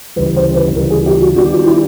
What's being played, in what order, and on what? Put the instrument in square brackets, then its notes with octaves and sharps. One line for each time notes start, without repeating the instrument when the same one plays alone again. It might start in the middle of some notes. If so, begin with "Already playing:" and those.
[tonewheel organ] D2 C#3 E3 G3 [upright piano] B4
[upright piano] C5
B4
[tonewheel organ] D2 C#3 E3 G3 [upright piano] A#4
[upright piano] G#4
G4
F#4
[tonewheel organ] D#3 G3 B3 D4 G4 [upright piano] F#4
[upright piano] F4
E4